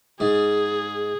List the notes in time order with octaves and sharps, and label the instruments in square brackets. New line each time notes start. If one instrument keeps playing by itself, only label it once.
[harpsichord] G#2 [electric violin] G#4